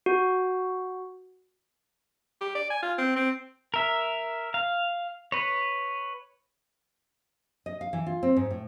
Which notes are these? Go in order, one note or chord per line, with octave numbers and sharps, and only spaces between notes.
F#4
G4
D5
G#5
F4
C4
C4
A#4 E5
F5
B4 C#5
D#5
F5
E3
F4
C4
G#2
A2